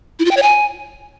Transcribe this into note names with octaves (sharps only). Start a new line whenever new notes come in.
E4
F4
G5
C#5
G#5